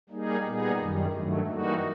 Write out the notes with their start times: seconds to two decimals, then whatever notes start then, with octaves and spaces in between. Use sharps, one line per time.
0.09 G3 A#3 D#4 G#4
0.44 A#2 G3 B3 D#4 G#4
0.79 F#2 D#3 G3
1.13 G2 D#3 F#3 A3
1.47 E3 G3 A#3 D#4 F#4